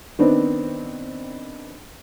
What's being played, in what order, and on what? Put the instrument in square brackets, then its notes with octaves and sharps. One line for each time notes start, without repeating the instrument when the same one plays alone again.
[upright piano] D#3 B3 C4 D4 D#4